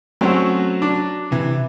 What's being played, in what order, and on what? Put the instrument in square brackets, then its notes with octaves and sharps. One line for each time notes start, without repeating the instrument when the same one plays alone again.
[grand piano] F#3 C#4 F#4 [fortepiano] A3 C4
[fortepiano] D4
[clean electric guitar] C3 [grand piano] E3